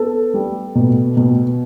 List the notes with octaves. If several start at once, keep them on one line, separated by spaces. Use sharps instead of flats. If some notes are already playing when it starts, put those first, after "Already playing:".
Already playing: B3 A4
G3
B2
B2